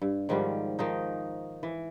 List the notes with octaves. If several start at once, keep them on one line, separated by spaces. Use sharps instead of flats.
G2
G#2 D#3 F3 G3
D#3 F3 D#4
E3